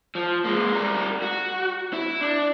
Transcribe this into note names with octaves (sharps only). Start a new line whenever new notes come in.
F3
G#3 A#3
G3 A#4
F#4
E4
D4